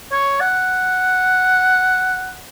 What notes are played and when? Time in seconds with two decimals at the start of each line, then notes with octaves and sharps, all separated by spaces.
0.12 C#5
0.40 F#5